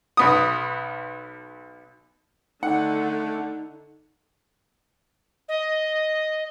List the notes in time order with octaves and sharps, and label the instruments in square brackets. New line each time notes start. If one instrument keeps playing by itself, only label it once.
[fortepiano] B1 B3 D#6
[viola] D3 [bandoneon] A3 D4 [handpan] D#4 [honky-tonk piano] F#5
[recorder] D#5